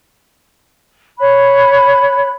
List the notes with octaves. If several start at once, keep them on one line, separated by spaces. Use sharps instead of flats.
C#5 B5 F#6